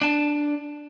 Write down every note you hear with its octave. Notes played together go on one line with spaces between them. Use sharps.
D4 A5